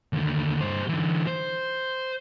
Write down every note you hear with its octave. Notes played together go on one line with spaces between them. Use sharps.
D#2 D3
G2 C5
D3 E3
C5